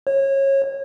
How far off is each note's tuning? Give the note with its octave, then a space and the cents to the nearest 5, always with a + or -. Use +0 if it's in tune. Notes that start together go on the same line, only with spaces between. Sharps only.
C#5 -25